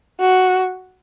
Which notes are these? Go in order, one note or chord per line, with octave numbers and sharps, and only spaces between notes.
F#4